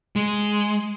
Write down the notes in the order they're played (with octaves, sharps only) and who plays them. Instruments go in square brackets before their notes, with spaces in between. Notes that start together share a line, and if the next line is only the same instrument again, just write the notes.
[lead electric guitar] G#3